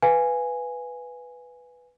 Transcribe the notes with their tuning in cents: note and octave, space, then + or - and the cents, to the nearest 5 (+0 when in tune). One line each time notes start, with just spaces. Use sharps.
B4 +0 F5 +0 G#5 -5